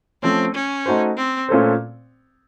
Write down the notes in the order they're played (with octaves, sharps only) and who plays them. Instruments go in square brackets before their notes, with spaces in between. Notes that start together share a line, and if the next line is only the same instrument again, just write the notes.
[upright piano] F3 A3 C#4 [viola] C4
[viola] C#4
[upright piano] A3 D#4 F#4 C5
[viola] C4
[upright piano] A#2 A3 C#4 A4 C5